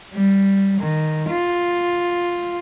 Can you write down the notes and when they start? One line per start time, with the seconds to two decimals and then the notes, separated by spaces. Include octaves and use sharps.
0.13 G3
0.80 D#3
1.30 F4